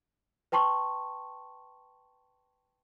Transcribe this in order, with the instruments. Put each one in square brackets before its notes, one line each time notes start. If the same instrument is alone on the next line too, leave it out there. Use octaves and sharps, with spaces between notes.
[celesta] B4 G5 A5 C6 C#6